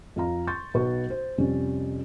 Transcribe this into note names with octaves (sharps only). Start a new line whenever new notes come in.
F2 F4 F5 A#5
C6 C#6 G6 A6
B1 B2 B4 C#6
C5
F2 C3 G3 C#4